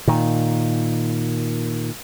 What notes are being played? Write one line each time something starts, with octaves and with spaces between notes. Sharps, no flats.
A#2 D#3